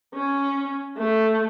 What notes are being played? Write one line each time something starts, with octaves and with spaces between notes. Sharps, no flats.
C#4
A3